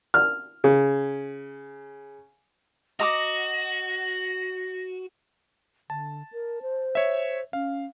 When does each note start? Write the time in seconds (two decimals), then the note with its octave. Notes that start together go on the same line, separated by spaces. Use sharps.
0.14 F6
0.64 C#3
2.99 F#4 D#5 A#5 D6 A#6
5.90 D3 A5
6.32 A#4
6.62 C5
6.95 C#5 E5
7.53 C#4 F5